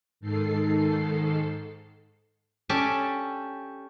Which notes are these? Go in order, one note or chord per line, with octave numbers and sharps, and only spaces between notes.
G#2 D#3 A4 C7
C#4 G4 A4 D5 G#5 A5